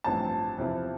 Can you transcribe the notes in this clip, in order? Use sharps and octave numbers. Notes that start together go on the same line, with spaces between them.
A1 G2 F3 C4 A5
E2 C3 F3 C4 E4